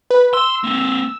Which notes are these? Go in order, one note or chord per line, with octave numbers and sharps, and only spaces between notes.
B4
C6 E6
A#3 C4